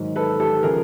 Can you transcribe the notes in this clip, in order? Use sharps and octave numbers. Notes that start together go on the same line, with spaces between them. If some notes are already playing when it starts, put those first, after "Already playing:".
Already playing: G#2 D#3 F#3
A4 B4
G4 A4
C#3 F3 G#4 A#4